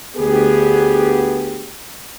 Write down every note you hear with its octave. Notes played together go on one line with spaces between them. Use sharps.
D2 B3 G4 G#4